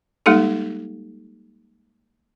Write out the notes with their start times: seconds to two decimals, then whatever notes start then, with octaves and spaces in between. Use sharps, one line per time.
0.26 G3 G#3 A#3 D#4 G4 A4